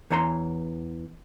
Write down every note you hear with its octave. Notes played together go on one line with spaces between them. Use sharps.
E2 E3 C#5 A#5 C6